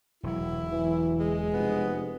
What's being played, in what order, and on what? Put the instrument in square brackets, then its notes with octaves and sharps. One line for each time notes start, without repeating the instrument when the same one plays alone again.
[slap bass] E1 F#3 [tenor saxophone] E4
[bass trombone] E3
[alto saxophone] G#3
[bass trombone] F1 [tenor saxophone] B3